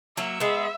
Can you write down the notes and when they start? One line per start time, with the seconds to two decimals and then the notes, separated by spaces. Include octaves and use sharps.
0.17 F#3 A#3 E5
0.40 G#3 B3